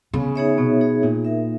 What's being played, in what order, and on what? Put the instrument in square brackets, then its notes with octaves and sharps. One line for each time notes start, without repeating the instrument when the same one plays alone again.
[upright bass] C#3 [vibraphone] B3
[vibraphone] D#4 G#4 C#5 E5
[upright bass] B2 [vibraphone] B3
[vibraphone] D#4 G#4 C#5 E5
[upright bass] A#2 [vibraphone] D#4
[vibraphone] A#4 E5